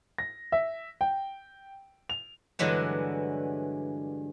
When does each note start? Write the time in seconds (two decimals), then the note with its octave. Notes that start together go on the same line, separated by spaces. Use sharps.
0.18 A#6
0.52 E5
1.01 G5
2.10 F7
2.59 G2 D3 E3 F#3 G#3